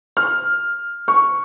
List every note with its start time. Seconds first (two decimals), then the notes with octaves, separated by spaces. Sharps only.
0.17 F6
1.08 C#6